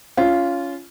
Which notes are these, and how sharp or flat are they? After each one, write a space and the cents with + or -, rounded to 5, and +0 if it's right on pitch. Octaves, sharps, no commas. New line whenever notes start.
C#4 +20 F4 -10